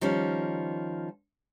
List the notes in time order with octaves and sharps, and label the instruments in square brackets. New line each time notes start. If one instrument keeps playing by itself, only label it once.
[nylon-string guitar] D#3 F3 G3 C#4